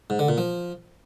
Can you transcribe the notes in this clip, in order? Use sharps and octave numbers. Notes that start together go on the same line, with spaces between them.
G#2
D3
A#2
F3